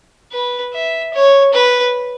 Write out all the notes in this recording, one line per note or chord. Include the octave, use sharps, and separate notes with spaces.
B4
E5
C#5
B4